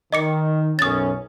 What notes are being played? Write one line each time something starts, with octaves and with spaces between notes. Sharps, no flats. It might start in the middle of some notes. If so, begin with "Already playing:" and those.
D#3 D#5 D6 C#7
B1 F#2 C#4 D#6 A6